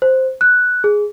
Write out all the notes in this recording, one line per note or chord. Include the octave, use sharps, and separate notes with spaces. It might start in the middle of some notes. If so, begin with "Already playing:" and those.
C5
F#6
G#4